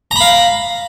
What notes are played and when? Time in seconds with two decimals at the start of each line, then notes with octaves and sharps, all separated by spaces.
0.11 A#5
0.16 B5
0.21 F5